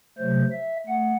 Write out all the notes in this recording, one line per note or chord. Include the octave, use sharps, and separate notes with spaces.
C3 F#3 A3 C5
E5
A3 F#5